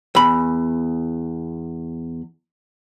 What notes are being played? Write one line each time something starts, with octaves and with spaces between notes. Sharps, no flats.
E2 B5